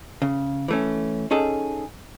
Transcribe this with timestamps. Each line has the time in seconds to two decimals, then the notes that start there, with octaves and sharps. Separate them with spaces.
0.22 C#3
0.68 E3 A3 C#4
1.31 C#4 D#4 G#4 A4 A5